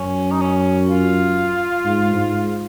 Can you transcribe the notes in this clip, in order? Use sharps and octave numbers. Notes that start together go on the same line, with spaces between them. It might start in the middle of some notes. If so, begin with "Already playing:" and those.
Already playing: F#2 C#4
D#4
C#4
F4
G#2
G#2